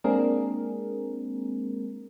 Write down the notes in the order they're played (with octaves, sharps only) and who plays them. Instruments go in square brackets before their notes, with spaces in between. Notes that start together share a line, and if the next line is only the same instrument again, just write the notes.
[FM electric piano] G#3 A#3 C4 D4 G#4 A#4